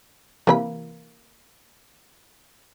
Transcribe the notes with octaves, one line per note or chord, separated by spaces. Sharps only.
C3 E3 A#3 B4 B5